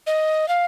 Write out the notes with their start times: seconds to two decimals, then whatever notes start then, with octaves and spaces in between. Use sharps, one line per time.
0.07 D#5
0.48 F5